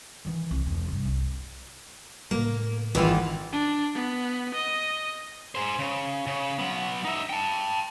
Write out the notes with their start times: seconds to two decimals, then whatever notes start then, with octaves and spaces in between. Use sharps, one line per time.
0.25 D#3 E3
0.51 C2
0.66 E1
0.88 G2 C3
1.05 C2
2.31 A2 C#3 A#3
2.95 G#1 E3 E4 F4
3.53 D4
3.95 B3
4.55 D#5
5.55 G#4 C5
5.79 C#3
6.26 C#3
6.59 F#3 B3
7.05 D#4 E5
7.29 G5 A5